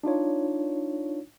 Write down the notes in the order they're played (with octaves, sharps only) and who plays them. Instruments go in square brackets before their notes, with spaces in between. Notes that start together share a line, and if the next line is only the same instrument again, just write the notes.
[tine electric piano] D4 D#4 F4 C#5